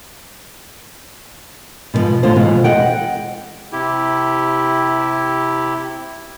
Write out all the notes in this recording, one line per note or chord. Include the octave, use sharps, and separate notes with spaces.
B2 D3 F3 G#3
A2 D3 A3 F4 C5
F2 B2 E3 G#3 F4
G#4 D#5 F#5 G5
C3 E4 G4